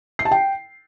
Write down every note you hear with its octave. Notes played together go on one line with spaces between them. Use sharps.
C7
A5
G5